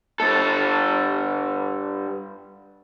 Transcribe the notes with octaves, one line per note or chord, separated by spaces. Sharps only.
G2 A4